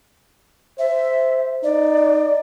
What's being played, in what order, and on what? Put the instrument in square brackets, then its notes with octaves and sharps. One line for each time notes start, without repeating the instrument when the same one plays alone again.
[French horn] C5 [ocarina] E5
[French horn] D#4 [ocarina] D5